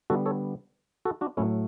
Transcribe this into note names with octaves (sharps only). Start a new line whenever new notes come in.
D3 G3 B3 F#4 A4
A4 C#5
F#4 A4
D4 F#4
A2 F#3 A3 C#4 E4